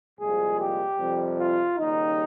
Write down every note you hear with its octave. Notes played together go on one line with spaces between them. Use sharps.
C2 A#2 F3 G#3 G#4
G4
F2 C3 G3
F4
D#2 C#3 G3 D#4